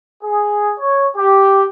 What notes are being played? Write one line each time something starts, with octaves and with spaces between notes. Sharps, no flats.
G#4
C#5
G4